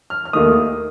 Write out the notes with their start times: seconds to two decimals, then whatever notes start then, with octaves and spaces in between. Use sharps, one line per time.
0.10 F6
0.25 F6
0.33 D#2 D#3 A3 D#6